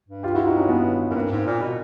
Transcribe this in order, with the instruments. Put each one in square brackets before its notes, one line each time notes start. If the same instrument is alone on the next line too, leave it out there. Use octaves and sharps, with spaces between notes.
[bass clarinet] G2
[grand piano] F4 G4
E4 F#4
D#4 F4
C#4 D#4
B3 C#4
[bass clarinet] F#2
[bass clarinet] G2 [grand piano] A#3 C4
[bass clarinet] G#2
A#2
B2